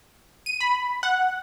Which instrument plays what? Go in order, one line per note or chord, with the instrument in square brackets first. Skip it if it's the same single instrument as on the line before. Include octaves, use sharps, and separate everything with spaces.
[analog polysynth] D#7
B5
F#5